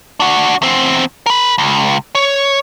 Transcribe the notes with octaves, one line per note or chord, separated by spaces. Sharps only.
D4 F#4
E2 C4
A#4 B5
C#2
C#5